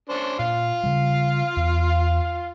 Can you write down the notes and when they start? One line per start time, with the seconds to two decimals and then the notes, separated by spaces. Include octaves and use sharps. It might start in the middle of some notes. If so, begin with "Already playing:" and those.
0.09 C#4 D4 C5
0.39 A#2 F4 F5
0.83 C#3 G3
1.56 E2